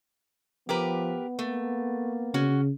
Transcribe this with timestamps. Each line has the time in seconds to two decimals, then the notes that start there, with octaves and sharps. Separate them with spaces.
0.69 F3 B3 G4 A#4 B4
1.39 A3 A#3
2.34 C#3 C#4 F#4